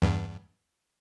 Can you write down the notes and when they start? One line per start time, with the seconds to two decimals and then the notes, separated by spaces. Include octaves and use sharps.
0.02 E2 G2